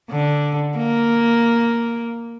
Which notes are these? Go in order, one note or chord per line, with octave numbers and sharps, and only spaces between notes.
D3
A#3